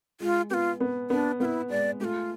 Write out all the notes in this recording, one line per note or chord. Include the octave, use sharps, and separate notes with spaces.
G#3 F4
B3 F4 G4
B3
B3 D4
B3 E4 F4
G#3 D5
A3 F4 G4